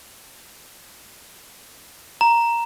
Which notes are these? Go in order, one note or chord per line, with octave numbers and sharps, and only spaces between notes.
A#5